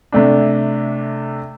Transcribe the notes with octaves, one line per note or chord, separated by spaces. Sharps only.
C3 A3 D4